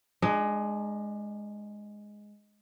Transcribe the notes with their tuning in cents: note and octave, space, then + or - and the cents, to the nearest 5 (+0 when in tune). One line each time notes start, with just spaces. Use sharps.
G#3 +5 D4 +35